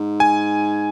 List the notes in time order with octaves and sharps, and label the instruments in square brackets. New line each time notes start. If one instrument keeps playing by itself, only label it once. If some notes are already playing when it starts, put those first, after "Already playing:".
Already playing: [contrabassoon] G#2
[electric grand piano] G#5